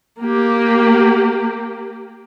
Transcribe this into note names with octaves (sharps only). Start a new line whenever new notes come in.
A#3 G4